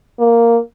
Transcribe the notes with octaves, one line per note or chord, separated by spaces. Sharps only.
A#3